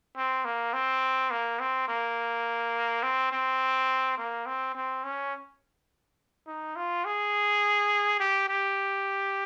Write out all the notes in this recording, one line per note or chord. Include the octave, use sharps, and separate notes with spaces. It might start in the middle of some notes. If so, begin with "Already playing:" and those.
C4
A#3
C4
A#3
C4
A#3
C4
C4
A#3
C4
C4
C#4
D#4
F4
G#4
G4
G4